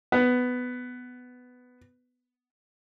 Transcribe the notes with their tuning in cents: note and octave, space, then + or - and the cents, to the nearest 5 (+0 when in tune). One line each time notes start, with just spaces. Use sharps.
B3 +10